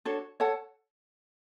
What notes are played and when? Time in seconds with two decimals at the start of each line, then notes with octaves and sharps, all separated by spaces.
0.05 D4 F#4 A4 C#5
0.40 A4 C#5 F#5 A5